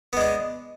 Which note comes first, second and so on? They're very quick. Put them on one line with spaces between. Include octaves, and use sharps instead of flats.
B3 G#3 D4